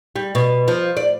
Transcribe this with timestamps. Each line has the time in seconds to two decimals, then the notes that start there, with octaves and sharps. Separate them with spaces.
0.16 G3
0.35 B2
0.68 F3
0.97 D5